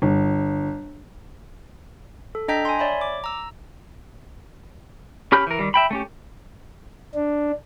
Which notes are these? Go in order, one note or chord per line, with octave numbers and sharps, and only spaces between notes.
G1
A4
D4 D#5 G5 A#5 G6 B6
G#5 C6
C#5 D5 E5 B5
D6
A#5 E6
C#4 G4 B5 F6 G6
E3 A#4
D#3 G3
E5 G5 B5
A3 C#4 G4
D4